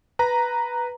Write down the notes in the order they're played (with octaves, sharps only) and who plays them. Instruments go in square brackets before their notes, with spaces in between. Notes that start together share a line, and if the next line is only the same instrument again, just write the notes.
[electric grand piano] B4 A#5